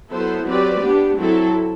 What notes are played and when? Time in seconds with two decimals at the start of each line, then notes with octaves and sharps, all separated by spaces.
0.12 F#3 B3 E4 A4 C5
0.46 F#3 C4 G4 B4 D5
0.82 B3 D4 G4
1.17 F#3 C4 E4 A4